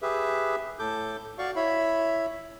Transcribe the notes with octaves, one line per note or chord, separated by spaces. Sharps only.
G4 G#4 B4 E5
A2 A4 D6 G6
F#4 D5 F5 C#6
E4 C#5 E5 B5